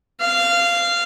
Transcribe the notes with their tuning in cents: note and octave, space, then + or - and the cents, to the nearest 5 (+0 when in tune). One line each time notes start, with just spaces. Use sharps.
F5 -15